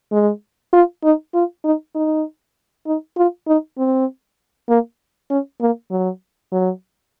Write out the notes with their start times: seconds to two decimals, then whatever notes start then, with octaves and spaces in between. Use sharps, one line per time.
0.12 G#3
0.73 F4
1.04 D#4
1.34 F4
1.64 D#4
1.95 D#4
2.87 D#4
3.17 F4
3.47 D#4
3.78 C4
4.69 A#3
5.30 C#4
5.61 A#3
5.91 F#3
6.52 F#3